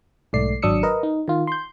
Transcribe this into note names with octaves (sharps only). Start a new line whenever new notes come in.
B1 G#2 A3 D5 C7
G#1 F#3 D4 D#6 E6 C#7
A#4 B4 D#5
D#4
D#3 F4
C6 G6